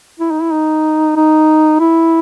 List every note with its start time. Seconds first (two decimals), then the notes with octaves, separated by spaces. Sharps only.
0.20 E4
0.31 D#4
0.42 E4
0.52 D#4
1.16 D#4
1.80 E4